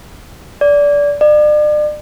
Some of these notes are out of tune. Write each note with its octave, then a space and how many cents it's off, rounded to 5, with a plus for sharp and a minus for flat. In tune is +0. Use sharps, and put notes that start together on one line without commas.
D5 -20
D5 +35